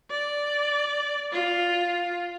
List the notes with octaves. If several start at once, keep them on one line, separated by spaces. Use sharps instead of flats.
D5
F4